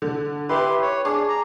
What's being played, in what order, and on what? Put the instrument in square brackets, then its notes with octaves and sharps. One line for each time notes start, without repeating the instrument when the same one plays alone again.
[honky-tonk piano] D3
[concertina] E4 G4 C6 [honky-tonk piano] B4
[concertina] C#5
[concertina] D4 [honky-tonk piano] G#4 D6
[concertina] A#5